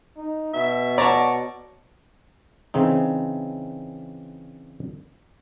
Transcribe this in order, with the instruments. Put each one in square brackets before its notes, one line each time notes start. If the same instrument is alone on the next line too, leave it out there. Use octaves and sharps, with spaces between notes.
[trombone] D#4
[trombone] B2 [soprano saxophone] E5
[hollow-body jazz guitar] C#5 F#5 A5 [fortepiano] D5 A#5 [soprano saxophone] C#6
[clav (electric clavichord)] C#3 E3 C4 D#4